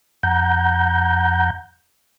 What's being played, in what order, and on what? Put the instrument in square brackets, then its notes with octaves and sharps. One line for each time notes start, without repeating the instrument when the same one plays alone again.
[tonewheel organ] F2 F#5 A#5 G6